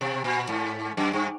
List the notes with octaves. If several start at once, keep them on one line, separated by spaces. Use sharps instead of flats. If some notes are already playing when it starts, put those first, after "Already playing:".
B2
A#2
G#2
F#2
G2